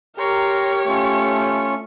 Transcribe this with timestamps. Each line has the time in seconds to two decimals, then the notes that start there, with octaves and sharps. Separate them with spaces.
0.19 G4 A#4 C#5 A#5 C6
0.89 A3 C#4 F4 C#6